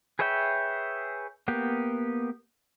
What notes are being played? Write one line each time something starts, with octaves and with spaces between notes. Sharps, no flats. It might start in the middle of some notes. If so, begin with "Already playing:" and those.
G#4 B4 C#5 E5 G5
A#3 B3 G4